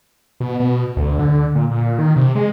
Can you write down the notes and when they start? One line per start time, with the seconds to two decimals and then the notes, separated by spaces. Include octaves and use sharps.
0.40 B2
0.60 B2
0.97 D2
1.19 D3
1.55 A#2
1.71 A#2
1.98 D#3
2.16 C3
2.35 G#3